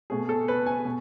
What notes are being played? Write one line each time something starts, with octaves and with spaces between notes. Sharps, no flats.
B2 A3 G#4
A4
B4
G#5
B2